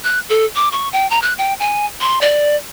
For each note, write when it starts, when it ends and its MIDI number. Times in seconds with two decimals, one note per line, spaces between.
0.04 0.20 90
0.30 0.46 69
0.56 0.69 86
0.72 0.89 85
0.93 1.09 79
1.10 1.21 82
1.22 1.33 90
1.38 1.54 79
1.60 1.86 80
2.01 2.21 84
2.21 2.56 74